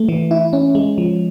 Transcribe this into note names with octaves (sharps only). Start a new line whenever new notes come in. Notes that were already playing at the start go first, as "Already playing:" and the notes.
Already playing: A3
E3
E4
C#4
G#3
F3